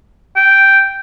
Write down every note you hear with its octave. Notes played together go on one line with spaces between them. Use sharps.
G5